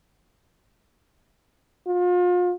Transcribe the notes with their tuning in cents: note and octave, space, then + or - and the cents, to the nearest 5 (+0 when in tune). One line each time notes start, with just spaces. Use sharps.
F4 +35